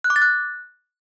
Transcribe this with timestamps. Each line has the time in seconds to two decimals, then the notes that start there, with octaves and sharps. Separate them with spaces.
0.04 F#6
0.10 D6
0.16 A6
0.22 F#6